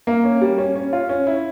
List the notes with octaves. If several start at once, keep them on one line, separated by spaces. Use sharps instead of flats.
A#3
C#4
G3
C#4
C#4
F4
C#4
E4